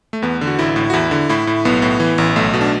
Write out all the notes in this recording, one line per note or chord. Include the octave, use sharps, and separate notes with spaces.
A3
E2 B3
D3
F#4
A1 E4
A2
F#4
E2 E4
D3
A2 E4
A2
B1 B3
A2
E3
A1
B1 A3
B2
D4